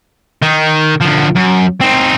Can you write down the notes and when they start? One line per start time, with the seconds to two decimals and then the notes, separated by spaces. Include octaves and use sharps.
0.42 D#3
1.01 D2 F3
1.36 F#2
1.81 C4 D#4